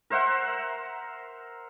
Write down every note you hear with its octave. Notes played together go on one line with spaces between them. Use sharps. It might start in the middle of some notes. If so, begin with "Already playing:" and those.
A#4 C5 E5 F#5